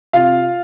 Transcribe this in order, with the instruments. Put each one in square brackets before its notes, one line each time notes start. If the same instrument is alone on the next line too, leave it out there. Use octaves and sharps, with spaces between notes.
[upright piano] C3 F4 F5